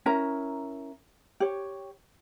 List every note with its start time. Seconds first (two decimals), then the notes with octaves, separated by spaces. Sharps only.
0.06 C#4 E4 A#4 A#5
1.40 G4 C#5